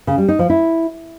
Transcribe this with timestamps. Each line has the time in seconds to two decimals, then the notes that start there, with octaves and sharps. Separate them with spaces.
0.07 C#3
0.18 G3
0.28 D#4
0.39 F3
0.50 E4